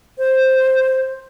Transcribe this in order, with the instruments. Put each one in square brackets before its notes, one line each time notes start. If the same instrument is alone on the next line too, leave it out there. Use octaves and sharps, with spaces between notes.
[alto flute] C5